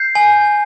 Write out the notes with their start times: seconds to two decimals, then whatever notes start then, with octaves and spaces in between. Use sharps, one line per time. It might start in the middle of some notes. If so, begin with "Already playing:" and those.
Already playing: G6 C7
0.15 G#5